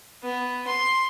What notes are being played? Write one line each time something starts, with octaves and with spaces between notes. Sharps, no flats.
B3
C6